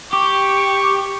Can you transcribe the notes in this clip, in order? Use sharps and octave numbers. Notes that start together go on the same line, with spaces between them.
G4 C#6